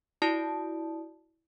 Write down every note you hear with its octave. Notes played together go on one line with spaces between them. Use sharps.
E4 F#4 D5 A5 D#6